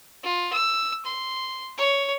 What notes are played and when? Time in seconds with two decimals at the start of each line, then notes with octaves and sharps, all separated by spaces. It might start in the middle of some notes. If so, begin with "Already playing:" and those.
0.23 F4
0.53 E6
1.05 C6
1.78 C#5